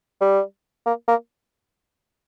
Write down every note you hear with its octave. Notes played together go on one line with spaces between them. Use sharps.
G3
A#3
A#3